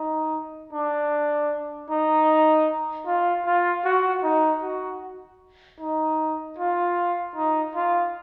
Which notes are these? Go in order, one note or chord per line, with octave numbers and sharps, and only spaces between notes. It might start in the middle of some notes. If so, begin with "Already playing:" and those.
Already playing: D#4
D4
D#4
F4
F4
F#4
D#4
F#4
D#4
F4
D#4
F4